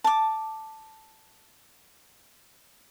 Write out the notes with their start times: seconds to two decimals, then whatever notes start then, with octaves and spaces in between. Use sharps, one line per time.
0.04 A5 D6